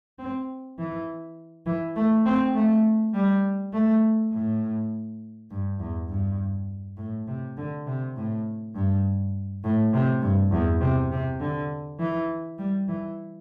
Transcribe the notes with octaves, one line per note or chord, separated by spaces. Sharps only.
C4
E3
E3
A3
C4
A3
G3
A3
A2
G2
E2
G2
A2
C3
D3
C3
A2
G2
A2
C3
G2
E2
C3
C3
D3
E3
G3
E3